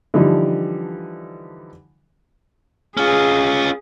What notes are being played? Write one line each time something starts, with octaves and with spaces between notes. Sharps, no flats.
D3 E3 F3 G3 D#4
C#4 F4 G#4